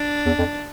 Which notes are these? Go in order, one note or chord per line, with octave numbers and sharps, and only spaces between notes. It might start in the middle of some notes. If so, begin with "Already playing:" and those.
Already playing: D4
E2
F2